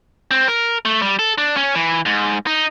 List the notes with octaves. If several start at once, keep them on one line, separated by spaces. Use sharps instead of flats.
C4
A#4
A3
G3
A4
D4
C#4
E3
G#2
D#4